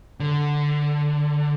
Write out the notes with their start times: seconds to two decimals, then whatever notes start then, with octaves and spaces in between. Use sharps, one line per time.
0.20 D3